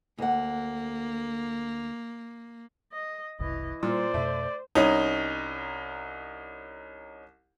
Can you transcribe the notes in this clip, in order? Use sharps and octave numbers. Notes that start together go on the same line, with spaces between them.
D2 A#3 F#5
D#5
F#1 C2 E3 D#5
A#2 G3 C5 D5
F2 B2 A3
C2 C#4 D#4